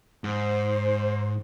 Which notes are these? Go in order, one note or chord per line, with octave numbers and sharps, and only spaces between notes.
G#2 C5